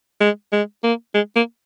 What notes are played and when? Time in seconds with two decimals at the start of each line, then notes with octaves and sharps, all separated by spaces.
0.20 G#3
0.52 G#3
0.83 A#3
1.14 G#3
1.36 A#3